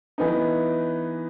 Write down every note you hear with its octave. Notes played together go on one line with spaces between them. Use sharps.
E3 B3 D#4